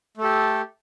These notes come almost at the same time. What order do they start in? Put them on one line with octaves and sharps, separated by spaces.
A3 A4 G4